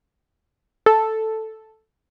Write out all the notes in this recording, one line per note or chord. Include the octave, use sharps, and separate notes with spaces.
A4